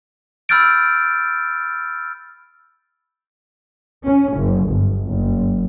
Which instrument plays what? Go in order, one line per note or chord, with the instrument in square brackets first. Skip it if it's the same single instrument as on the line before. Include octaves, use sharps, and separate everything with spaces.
[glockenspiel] B5 E6 F6 G6 A6 D7
[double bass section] C#4
F#1
G1
F#1